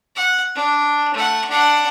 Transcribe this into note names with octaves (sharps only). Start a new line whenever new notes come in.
F#5
D4
A3 F#5
D4 F#5